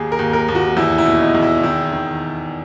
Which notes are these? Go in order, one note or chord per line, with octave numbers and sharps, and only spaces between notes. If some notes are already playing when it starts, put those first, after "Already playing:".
Already playing: D#2 G#4
A#4
D#2
A#4
D#2
F#4
E2 E4
E4
B2
D#4
E2
E4
D#3 E4
D#3